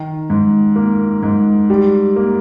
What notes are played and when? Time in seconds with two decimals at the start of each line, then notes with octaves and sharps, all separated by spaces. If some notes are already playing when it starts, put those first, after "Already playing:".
Already playing: D#3
0.30 G#2
0.76 A#3
1.23 G#2
1.70 G3
2.16 A#3